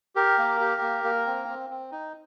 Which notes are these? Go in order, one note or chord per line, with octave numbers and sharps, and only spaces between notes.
G4 A#4
A#3
G4
A#3
A#3
C4
C4
C4
D#4